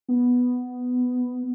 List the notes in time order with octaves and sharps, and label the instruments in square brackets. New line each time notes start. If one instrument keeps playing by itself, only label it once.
[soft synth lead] B3